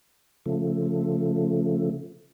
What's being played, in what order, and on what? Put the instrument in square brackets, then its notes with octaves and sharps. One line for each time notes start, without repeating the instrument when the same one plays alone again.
[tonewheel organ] C#3 F3 A3